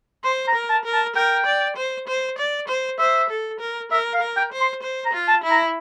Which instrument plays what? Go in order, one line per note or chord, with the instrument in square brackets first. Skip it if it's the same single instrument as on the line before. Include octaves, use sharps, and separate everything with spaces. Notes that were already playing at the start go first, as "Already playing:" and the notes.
[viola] C5 [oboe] C6
[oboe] A#5
[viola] A#4
[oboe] A5
[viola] A#4
[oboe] A5
[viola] A#4 [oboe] G5
[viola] D5
C5
C5
D5
C5
[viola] C5 [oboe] E5
[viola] A4
A#4
[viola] A#4 [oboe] E5
[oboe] F5
[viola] A#4
[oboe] G5
[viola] C5
[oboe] C6
[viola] C5
[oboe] A#5
[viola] F4
[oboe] A5
[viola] E4
[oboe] A#5